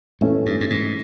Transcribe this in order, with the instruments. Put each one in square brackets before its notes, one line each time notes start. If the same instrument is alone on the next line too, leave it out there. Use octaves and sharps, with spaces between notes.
[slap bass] A2 [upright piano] E3 A3 C#4
[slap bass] G2
G2
G#2